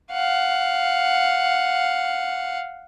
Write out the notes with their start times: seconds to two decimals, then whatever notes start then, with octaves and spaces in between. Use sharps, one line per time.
0.12 F5 F#5